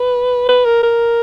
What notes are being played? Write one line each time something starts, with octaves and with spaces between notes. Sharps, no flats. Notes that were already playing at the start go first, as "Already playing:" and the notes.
Already playing: B4
B4
A#4
A#4